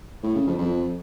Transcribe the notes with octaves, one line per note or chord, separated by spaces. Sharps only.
A2
C#3
F2
F2